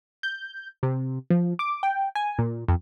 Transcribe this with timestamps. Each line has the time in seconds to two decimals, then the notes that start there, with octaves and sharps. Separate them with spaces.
0.23 G6
0.83 C3
1.30 F3
1.59 D6
1.83 G5
2.15 G#5
2.39 A#2
2.68 F2